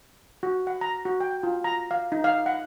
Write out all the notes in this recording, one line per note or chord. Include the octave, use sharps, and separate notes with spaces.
F#4
F#5
A#5
F#4
G5
F4
A#5
F5
D#4
F5
F#5